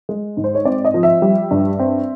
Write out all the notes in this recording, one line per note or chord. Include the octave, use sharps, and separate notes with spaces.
G#3
G#2
C5
C#5
C4 D5
D#5
F3
E5
G3
G2
C4